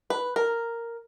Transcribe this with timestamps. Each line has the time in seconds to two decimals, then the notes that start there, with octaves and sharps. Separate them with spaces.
0.10 B4
0.36 A#4